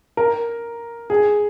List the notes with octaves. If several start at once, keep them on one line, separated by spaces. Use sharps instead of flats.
A#4
G#4